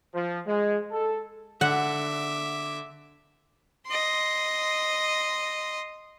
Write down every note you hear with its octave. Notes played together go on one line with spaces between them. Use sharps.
F3
G#3
A4
D3 E5 F#5 D6
D#5 C6